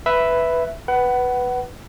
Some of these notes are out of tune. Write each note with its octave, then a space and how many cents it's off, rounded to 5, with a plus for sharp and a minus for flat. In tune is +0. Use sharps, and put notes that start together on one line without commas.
B4 +5 E5 +0
B4 +0 F#5 +25